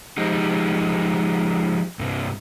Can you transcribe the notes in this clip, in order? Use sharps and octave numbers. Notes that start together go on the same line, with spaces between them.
F3 G#3 D#4 G4
G2 C3